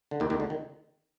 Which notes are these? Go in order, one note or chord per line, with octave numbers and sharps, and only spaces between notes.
D3
D#2 D#3
D#2 D#3
D2 D3
D#3